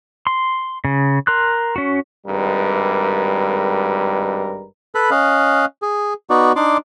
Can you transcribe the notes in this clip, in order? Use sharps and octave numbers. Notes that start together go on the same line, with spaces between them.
C6
C#3
A#4 C6 F#6
C#4 F#4
G#1 G2 G3 G#3 A#4 B4
A4 B4 B5
C#4 D#5 F5 F#6
G#4
B3 D#4 F#4 D5
D4 D#4 D5 C6 D6